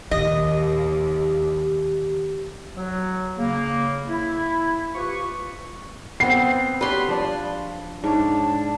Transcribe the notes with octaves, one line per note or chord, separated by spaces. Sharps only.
D#2 A#2 D#3 G4 D#5
F#3
C#3 A#3
E4
F4 G4 B4 C#6
B3 C4 C7
D4 G4 B4 C#5 C6
F3 D4
G#2 D4 C#5